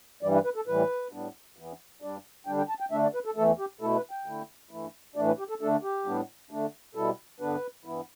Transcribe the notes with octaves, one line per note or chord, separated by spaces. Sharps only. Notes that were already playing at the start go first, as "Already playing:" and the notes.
G2 E3 G3 D5
B4
B4
A4
A2 E3 G3 B4
A2 G3 B3 D4
E2 E3 B3
G2 G3 D4 D5
D3 G3 D4 G5
G5
A5
G5
D3 A3 D4 E5
D5
B4
A4
E2 E3 A3 A4
G4
B2 A3 E4 A4
B4
G5
D3 A3 E4
G2 E3 A3 E4
A2 E3 A3 D4 D5
B4
G4
A4
D3 A3 D4 A4
G4
A2 G3 B3 D4
D3 A3 D4
B2 G3 E4 A4
G2 D3 B3 D4 B4
G2 E3 B3 E4